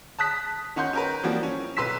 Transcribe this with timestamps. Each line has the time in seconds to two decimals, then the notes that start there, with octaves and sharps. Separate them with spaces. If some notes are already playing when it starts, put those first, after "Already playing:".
0.19 A5 D#6 F#6 B6
0.76 D#3 C#4 F#5 C6 G6
0.93 C#4 A#4 B4
1.23 E3 F3 G3 A#3 C4 F#4
1.43 C#4
1.76 B1 B4 C6 E6 B6 E7